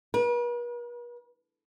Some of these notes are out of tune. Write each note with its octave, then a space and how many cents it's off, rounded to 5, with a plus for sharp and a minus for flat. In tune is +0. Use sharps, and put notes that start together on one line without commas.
B4 -45